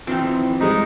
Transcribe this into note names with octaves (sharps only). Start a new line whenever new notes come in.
F2 D#3 E3 C4
G3 G#3 D#4